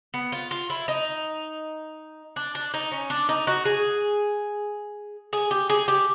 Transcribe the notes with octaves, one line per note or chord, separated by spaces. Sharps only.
B3
F4
F4
E4
D#4
D4
D4
D#4
C#4
D4
D#4
F#4
G#4
G#4
G4
G#4
G4